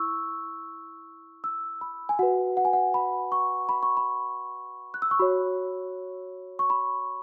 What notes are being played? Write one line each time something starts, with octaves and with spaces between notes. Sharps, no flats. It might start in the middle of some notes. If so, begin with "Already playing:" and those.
Already playing: E4 C#6 E6
E6
B5
G#5
F#4 B4 F#5
F#5
G#5
F#5
B5
C#6
B5
C#6
B5
F#6
E6
C#6
F#4 C#5 B5
C#6
B5